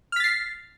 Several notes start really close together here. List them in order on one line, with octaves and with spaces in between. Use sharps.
F6 B6 A6 C7